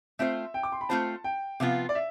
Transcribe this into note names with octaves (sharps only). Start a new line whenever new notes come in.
A3 C4 F4 C5 E5
G5
D6
C6
B5
A3 C4 F4 C5 A5
G5
C3 F3 B3 F4 F5
D5
E5